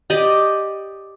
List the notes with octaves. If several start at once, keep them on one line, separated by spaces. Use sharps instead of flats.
G4 D5 D#5